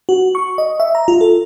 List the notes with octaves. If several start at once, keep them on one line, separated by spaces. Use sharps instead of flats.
F#4
C#6
D#5
E5
A#5
F4
A4